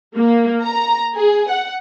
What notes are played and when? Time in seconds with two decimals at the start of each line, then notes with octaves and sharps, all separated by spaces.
0.16 A#3
0.63 A#5
1.16 G#4
1.50 F#5